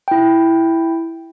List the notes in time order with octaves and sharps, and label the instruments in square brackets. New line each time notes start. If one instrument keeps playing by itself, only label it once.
[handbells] E4 G5